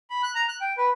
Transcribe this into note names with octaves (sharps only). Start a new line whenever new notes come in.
B5
F#6
A#5
F#6
G5
B4